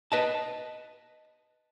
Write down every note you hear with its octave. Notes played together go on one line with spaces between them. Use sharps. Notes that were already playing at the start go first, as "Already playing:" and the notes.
B4 D#5 A5